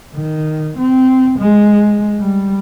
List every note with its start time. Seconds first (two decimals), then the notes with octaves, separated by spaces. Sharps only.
0.15 D#3
0.78 C4
1.39 G#3
2.19 G3